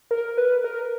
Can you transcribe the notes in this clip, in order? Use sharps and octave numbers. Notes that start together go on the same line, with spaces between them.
A#4
B4
A#4